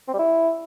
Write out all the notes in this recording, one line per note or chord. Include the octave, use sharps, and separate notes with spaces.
C4
G3
E4